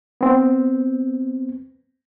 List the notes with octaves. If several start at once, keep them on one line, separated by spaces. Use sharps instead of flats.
B3 C4